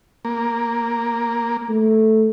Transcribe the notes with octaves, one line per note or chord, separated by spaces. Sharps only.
A#3
A3